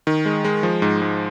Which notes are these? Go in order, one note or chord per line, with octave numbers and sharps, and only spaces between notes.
D#3
G#3
G#3
F3
G#2
G#2